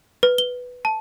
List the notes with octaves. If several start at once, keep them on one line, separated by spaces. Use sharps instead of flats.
B4
G7
A5